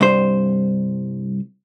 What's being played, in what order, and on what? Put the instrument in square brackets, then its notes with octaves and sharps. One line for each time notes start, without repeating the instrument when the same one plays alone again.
[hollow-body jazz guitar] C2 G2 C5